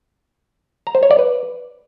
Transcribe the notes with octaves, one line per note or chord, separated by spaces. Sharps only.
A#5
C5
C#5
D5
B4